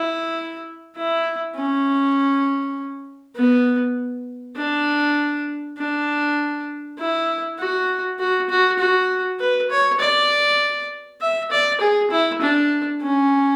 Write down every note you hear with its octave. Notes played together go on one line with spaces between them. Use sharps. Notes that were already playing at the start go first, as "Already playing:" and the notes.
Already playing: E4
E4
C#4
B3
D4
D4
E4
F#4
F#4
F#4
F#4
B4
C#5
D5
E5
D5
G#4
E4
D4
C#4